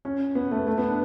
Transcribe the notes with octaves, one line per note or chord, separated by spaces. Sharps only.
C#4
B3
A3
A3
B3
D4